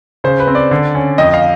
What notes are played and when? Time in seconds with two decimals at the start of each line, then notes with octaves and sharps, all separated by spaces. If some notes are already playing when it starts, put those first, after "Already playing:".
0.24 C#3 C5
0.40 B4
0.47 C4
0.55 D5
0.71 D3
0.95 C#4
1.18 F2 D#5
1.34 F5